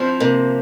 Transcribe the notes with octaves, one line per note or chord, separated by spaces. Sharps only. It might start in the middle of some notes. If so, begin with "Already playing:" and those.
Already playing: F3 C4 E4
C3 A#3